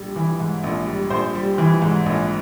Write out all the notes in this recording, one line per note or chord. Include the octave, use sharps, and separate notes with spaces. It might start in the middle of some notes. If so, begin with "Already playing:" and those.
Already playing: A#1 G3
E3
G#2
A#1
G3
A#1 C5
G3
E3
G#2
A#1